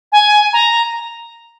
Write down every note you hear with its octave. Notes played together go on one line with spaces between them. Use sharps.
G#5
A#5